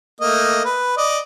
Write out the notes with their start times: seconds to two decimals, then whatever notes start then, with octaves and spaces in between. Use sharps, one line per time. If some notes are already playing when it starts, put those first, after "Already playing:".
0.21 A3 A#3 D#5
0.65 B4
0.97 D5 D#5